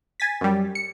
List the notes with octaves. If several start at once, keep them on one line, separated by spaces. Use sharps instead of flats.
G#5 A6 B6
F#2 G3
C#7